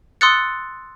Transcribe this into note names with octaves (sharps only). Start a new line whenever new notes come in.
C6 D#6 E6 F#6 A6 C#7